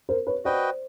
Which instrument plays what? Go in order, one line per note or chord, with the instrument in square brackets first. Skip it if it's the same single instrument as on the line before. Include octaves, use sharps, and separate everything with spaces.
[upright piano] A#4 C5
B4 C#5
[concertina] F#4 B4 D#5 G5 [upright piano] C5 D5